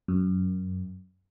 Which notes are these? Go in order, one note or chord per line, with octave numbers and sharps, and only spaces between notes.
F#2